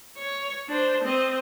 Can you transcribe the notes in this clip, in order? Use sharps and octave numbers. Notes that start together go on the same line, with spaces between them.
C#5
D4 C5
C4 D#5